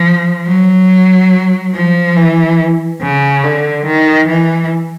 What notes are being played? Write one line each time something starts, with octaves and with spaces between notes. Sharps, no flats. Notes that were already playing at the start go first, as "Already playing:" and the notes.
Already playing: F3
F#3
F3
E3
C#3
D3
D#3
E3